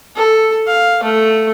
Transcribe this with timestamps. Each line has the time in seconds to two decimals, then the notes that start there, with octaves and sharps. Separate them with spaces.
0.16 A4
0.67 F5
1.03 A3